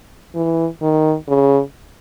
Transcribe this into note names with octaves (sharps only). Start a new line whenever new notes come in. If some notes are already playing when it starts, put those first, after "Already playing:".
E3
D#3
C#3